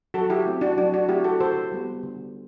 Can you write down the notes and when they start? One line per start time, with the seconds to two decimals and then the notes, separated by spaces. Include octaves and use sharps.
0.14 F#3 F#4 A4
0.30 E4 G4
0.46 A3 C4
0.61 D4 F#4
0.77 F#3 D4
0.94 D4 F#4
1.09 A3 C4 E4 G4
1.24 F#4 A4
1.40 D3 A4 C5
1.72 G3 B3
2.03 D3